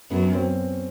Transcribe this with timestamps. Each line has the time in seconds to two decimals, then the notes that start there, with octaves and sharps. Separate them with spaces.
0.11 F#2 B3
0.23 C#4
0.35 C4